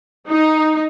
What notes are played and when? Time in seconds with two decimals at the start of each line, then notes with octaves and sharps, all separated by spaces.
0.29 D#4